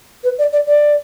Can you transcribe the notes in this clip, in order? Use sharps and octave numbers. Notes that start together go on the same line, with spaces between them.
B4
D5
D5
D5